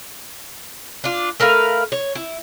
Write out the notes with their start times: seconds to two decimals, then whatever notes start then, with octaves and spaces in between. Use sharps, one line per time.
1.04 D4 F4
1.40 A3 A#4 B4 F5
1.92 C#5
2.15 E4